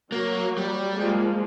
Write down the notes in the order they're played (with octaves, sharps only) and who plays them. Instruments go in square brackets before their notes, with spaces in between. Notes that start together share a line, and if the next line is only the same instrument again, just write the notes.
[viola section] F#3 [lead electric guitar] A#3
[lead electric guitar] G3
[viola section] F3 G#3 A#3